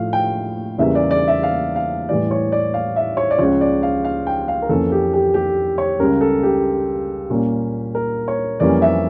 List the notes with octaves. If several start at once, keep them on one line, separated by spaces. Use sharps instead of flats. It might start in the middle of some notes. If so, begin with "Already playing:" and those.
Already playing: A2 F3 A3 F5
G5
E2 C#3 E3 G3 A#3 E5
D5
D5
E5
F5
F5
A2 E3 G3 D5
C#5
D5
F5
E5
C#5
D5
C#2 C#3 F3 C#5
D5
F5
F5
G5
F5
A#4
F2 E3 A#3 C#4 A4
G4
G4
G4
C#5
C#2 C#3 G3 A#4
A4
G4
A#2 G3 A#3 C#4
A#4
C#5
F2 E3 G3 A#3 C#4 D5
E5